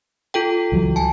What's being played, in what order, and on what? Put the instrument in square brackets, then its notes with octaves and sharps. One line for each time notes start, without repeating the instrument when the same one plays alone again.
[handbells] F4 A4 G5
[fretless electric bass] C#2 E3 F#3
[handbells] G#5 A5